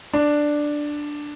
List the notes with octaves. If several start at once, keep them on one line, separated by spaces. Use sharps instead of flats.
D4